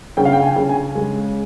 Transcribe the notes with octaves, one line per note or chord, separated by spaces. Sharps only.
C#3 G5
F5
G5
G#5
C#3
G#5
G#3